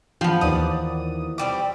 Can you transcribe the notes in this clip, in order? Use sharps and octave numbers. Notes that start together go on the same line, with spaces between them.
F3 B3 F4 G5
D#2 E3 D5 D#6
B2 G3 C4 D6